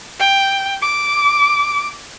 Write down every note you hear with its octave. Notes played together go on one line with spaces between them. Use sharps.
G5
D6